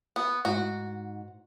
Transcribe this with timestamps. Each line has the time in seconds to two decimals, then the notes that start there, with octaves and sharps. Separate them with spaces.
0.16 B3
0.45 G#2 F#4